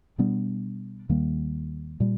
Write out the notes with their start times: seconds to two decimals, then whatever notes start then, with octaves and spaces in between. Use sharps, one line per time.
0.18 B2 G3 B3 D4
1.09 D#2 D#3 G3 A#3
2.00 A#2 G3